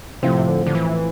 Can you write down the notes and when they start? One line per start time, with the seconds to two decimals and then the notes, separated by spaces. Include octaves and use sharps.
0.23 A2 C3 F3 C4
0.48 D3
0.67 D3
0.75 E3